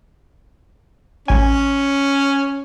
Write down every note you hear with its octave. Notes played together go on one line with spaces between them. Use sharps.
A1 C#4 G#5